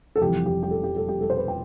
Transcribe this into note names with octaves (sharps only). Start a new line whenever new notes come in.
A4
F1 F2 E3 G4
G4
G4
A4
G4
A4
G4
A4
C5
B4
G5